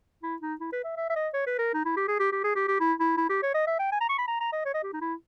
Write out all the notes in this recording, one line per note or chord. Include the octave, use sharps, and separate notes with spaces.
E4
D#4
E4
B4
E5
E5
E5
D#5
C#5
B4
A#4
D#4
E4
G4
G#4
G4
G4
G#4
G4
G4
E4
E4
E4
G4
C#5
D#5
E5
G5
G#5
A#5
C#6
B5
A#5
A#5
D#5
C#5
D#5
G4
D#4
E4